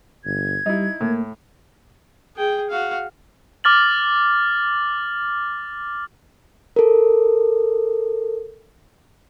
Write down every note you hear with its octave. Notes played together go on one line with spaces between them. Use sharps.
G1 G#6
G3 D#4 E4
A2 A#3
G#4 G5
F#4 F5
D6 F6 A6 F#7
A4 A#4